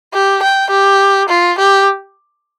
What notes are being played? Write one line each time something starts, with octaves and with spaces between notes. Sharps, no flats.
G4
G5
G4
F4
G4